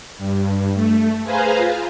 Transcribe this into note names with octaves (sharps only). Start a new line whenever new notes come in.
G2
A3
G#4 B4 C5 F5 G#5 A#5
F4